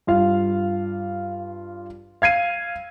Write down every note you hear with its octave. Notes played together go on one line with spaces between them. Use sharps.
G2 F4 F5
F5 G#6 C7 D#7